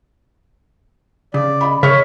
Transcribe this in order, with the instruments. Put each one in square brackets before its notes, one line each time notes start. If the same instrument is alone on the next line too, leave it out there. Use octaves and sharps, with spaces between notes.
[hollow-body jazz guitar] C#3 [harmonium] D5
[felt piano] D#5 B5
[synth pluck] C#3 [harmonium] C#5 [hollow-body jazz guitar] E5 [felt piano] C#6 F6